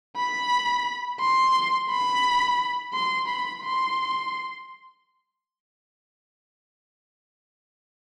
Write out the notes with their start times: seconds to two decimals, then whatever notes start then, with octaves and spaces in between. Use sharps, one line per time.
0.17 B5
1.20 C6
1.90 B5
2.94 C6
3.28 B5
3.64 C6